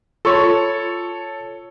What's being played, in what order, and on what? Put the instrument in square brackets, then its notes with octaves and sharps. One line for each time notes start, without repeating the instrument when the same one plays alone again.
[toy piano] F4 C6 C#6 [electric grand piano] A4 C#5